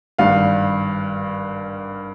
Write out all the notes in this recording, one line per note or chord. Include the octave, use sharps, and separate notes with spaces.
G#1 G2 G3 F5